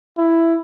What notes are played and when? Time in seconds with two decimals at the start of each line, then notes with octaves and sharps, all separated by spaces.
0.18 E4